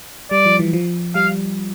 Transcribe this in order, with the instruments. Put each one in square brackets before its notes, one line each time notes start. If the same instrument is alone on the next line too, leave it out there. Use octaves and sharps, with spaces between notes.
[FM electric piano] G3 [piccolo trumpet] D5
[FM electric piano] F3
E3
F3
[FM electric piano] G3 [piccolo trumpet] F5